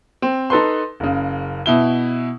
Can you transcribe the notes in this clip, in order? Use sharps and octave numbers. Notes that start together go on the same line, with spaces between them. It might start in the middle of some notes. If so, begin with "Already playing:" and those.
C4
D#4 A4 B4 C6
F#1 C#3
B2 E4 G7